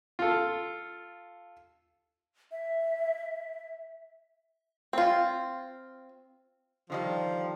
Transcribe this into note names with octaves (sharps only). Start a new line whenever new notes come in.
F4 A4
E5
C4 F4
D3 D#3 F3 G3